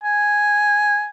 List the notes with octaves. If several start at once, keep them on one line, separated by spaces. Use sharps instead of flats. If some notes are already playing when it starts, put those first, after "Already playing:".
G#5